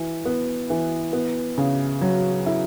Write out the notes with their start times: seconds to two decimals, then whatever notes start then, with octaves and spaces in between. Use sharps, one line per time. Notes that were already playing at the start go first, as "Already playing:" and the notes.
Already playing: E3
0.26 B3
0.70 E3
1.13 B3
1.58 C#3
2.01 F#3
2.46 E4